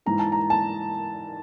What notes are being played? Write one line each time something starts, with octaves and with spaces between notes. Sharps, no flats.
G#2 E3 A#5
A5
A#5
A5